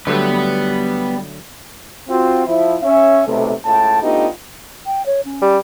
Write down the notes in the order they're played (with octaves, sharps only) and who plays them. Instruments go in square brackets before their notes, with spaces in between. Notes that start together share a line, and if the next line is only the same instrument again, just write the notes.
[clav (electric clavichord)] D3 F#3 A3 [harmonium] G3 [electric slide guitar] B3 B4
[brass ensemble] C4 F4 F#4
F3 E4
C#4 E5
B1 C3 A3
C#2 A2 G5 A5
A3 B3 D4 D#4 F4 G4
[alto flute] G5
C#5
C#4
[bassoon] G3